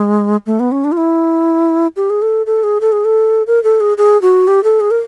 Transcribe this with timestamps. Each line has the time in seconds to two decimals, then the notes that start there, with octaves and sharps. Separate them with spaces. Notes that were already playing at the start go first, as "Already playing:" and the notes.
Already playing: G#3
0.46 A3
0.60 B3
0.72 C#4
0.84 D4
0.92 F4
0.97 E4
1.96 G4
2.10 G#4
2.22 A4
2.46 A4
2.63 G#4
2.81 A4
2.92 G#4
3.05 A4
3.47 A#4
3.64 A4
3.80 G#4
3.98 G#4
4.22 F#4
4.48 G4
4.64 A4
4.80 G#4
4.91 A#4